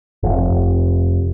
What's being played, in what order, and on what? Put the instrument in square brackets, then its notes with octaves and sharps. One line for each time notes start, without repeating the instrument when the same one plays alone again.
[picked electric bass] F1